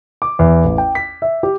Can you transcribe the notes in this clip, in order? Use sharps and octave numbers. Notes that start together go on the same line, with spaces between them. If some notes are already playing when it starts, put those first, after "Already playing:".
D6
E2
A1
G5
B6
E5
G4